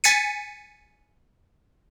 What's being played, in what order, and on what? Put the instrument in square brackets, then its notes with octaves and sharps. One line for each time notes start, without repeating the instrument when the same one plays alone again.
[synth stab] G#5 A6 B6 C#7 D#7